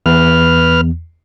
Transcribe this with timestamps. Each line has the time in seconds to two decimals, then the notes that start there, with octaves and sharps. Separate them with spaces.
0.06 E2 B4 F6